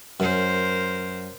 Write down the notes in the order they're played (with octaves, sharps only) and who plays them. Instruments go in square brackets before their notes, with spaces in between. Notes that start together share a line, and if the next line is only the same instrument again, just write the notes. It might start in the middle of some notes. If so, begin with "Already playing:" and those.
[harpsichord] F#2 [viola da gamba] A#4 C5